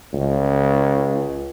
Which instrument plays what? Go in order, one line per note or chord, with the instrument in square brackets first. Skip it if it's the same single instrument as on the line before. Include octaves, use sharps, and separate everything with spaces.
[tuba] C#2